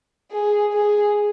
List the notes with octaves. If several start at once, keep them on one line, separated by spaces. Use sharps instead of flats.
G#4
G#4